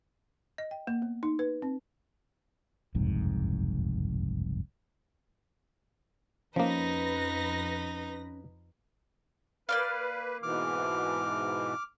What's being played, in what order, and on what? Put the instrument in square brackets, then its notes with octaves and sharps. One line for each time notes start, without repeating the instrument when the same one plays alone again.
[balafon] D#5
G5
A#3
B3
D#4
B4
C4
[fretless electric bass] F#1 C2 F2 G#2
[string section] F2 B4 A#6 [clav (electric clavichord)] F3 A#3 [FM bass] C#4 [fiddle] D#4
[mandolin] A#3 D5 F5 [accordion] B4
[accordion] G#2 B2 E3 [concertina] D6 F6